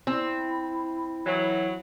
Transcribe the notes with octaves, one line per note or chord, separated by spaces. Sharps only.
C4 E4
E3 F#3